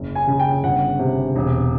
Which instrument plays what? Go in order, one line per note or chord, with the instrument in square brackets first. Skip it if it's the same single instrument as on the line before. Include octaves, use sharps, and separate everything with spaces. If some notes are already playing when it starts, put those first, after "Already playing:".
Already playing: [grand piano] F#1
G#5
C#3
G5
G1 F#5
C3
E1